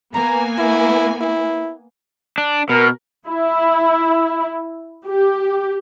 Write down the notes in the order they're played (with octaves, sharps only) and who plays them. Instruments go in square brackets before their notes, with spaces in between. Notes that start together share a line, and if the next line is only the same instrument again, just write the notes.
[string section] A#3 B3 G#5 [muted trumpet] A#5
[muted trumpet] E4
E4
[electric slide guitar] D4
[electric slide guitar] B2 [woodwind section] A#4
[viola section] E4
G4